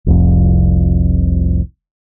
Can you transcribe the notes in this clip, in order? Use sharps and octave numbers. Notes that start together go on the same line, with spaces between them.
F1 C2 F2